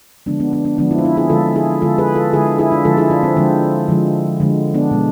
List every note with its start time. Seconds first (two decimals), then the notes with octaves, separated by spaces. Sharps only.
0.26 D3 F3 G#3 B3 D4
0.40 B3 D4
0.53 B3 D4
0.65 B3 D4
0.78 D3 F3 G#3 B3 D4
0.91 C4 E4
0.98 F4
1.05 C4 E4
1.17 E4 G#4
1.30 D3 F3 G#3 F4 A4
1.56 E4 G#4
1.82 D3 G#3 F4 A4
1.98 G#4 B4
2.16 F4 A4
2.33 D3 E4 G#4
2.37 G#3
2.59 E4 G#4
2.72 D4 F4
2.85 D3 F3 G#3 F4 A4
2.97 E4 G#4
3.10 D4 F4
3.23 C4
3.37 D3 F3 G#3 C4
3.88 D3 F3 G#3
4.40 D3 F3 G#3
4.74 B3 D4
4.91 B2 G#3